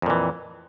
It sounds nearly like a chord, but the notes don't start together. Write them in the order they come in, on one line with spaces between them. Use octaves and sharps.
F2 A#2 E3